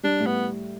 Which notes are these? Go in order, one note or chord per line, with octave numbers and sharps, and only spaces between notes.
G3 D4
A2
B3